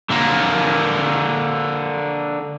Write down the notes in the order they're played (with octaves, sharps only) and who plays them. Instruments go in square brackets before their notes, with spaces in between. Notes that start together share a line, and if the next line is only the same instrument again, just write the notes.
[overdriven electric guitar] D3 A#3